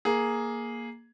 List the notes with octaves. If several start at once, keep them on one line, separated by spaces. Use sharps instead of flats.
A#3 G#4